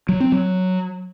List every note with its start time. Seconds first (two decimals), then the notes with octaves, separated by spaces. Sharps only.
0.09 F#3
0.20 C4
0.32 F#3